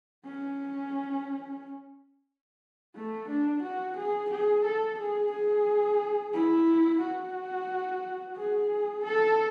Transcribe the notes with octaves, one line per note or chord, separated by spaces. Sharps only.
C#4
A3
D4
F#4
G#4
G#4
A4
G#4
G#4
E4
F#4
G#4
A4